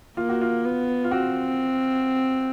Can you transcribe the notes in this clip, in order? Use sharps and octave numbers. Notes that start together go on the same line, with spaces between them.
A#3 F4
F#4
F4
B3
F4
C4 F#4